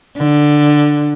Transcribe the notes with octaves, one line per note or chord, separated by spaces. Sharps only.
D3